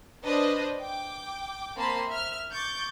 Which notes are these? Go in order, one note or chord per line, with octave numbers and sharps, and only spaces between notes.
D4 B4 C5 D#5
G5 D6
A#3 C4 A5 B5 C6
E5 F6
C#6 D6 G6 A6